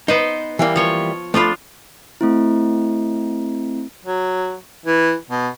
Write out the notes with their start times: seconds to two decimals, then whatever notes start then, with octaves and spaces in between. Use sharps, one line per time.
0.08 B3 D#4 B4 C5
0.59 E3 G3 A#3
0.76 F3 C#5
1.34 F3 A3 D4 F4 B5
2.21 A3 C4 E4
4.05 F#3
4.86 E3
5.30 B2